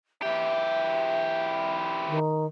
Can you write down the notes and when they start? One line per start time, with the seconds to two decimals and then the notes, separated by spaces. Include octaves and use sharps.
0.22 E3 G4 E5
2.08 D#3